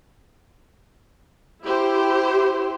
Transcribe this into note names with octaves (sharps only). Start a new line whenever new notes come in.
E4 G4 C5